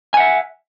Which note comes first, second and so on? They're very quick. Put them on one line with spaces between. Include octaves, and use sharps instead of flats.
G#5 F#5 E5